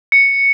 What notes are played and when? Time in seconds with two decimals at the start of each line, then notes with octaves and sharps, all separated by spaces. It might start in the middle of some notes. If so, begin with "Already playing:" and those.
0.12 C#7